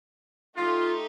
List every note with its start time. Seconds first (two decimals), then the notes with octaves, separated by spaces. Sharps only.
0.56 A3 D#4 F4 G4